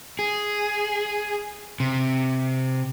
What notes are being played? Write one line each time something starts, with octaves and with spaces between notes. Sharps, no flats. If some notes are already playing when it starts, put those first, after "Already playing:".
G#4
C3